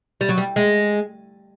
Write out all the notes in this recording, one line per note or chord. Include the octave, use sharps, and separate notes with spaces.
G3
F#3
G3
G#3